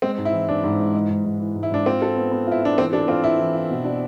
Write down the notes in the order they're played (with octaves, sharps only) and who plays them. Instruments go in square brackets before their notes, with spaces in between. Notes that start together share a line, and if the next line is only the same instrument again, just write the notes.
[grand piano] G#3 [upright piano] C4
[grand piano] G#2
[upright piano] E4
[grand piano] E3
[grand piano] G#2 [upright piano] D4
[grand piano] G#2
G#3
G#3
G#2
G#2
E3
G#2
[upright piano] E4
[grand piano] G#2 [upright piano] D4
[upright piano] C4 [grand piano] F4
[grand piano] A4
B3
B3
[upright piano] E4 [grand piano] F4
[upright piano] D4 [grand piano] F4
[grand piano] E3 [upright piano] C4
[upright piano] D4 [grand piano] A4
[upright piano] C4 [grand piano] F4
[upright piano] E4 [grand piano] F4
[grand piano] E3
F4
B2
D4